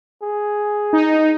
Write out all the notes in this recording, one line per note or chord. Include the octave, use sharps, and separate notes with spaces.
G#4
D#4